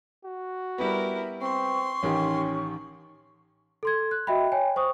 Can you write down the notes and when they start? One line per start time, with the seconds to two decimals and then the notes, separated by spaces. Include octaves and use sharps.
0.24 F#4
0.78 G3 B3 E4 A#4
1.41 C4 C6 C#6
2.03 A1 D#3 C#4 G4
3.83 A4 C6 G#6
4.11 F#6
4.27 F#4 D#5 E5 G5 B5
4.52 C#5 G5 G#5
4.76 C5 C#6 D#6